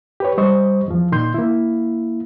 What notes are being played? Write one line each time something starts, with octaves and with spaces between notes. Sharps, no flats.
G4 B4 C#5
G3 C5 D#5 C#6
E2 F3
A#2 D#3 C6 G6
A#3 E4